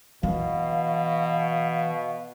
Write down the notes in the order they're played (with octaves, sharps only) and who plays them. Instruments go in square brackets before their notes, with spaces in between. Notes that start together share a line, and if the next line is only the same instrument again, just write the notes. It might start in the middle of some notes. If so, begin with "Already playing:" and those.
[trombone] B2 [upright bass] E3 F#3 [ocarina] F5